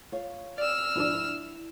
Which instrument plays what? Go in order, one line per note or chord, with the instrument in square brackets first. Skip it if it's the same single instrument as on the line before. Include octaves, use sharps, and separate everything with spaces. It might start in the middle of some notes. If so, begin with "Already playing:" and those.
[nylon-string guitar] F4 C#5
[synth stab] D5 [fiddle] E6 F6
[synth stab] G#1 F3 D4 [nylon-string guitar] E4